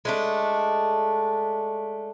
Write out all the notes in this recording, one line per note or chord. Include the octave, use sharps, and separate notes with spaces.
G#3 A3 D4